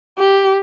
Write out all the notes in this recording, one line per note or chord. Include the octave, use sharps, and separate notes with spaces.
G4